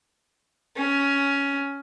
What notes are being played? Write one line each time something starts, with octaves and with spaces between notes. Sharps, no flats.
C#4